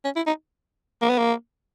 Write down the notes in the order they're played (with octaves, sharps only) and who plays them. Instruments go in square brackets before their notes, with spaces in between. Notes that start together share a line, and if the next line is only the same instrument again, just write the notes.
[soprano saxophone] C#4
E4
D#4
A#3
B3
A#3